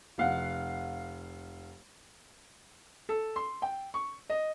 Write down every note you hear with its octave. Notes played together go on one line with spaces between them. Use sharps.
F1 F5 F#5
A4
C6
G5
C#6
D#5